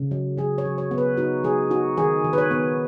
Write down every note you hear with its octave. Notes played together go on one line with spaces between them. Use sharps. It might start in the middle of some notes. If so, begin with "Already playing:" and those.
Already playing: C#3
F#3
F#3 G#4
C#5
F#3
C#5
B3
B4
D#4 F#4
F#3 G#4
D#4 F#4
D#3 G#4
D#3
B4
C#5
B3